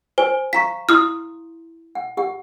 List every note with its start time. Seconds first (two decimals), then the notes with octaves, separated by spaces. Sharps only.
0.18 C5 G#5
0.53 F5 A#5 C#6 B6
0.89 E4 C6 D#6 F6
1.95 F#5
2.17 G4 F#5